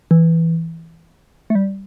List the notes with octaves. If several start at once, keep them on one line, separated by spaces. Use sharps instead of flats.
E3
A3
G3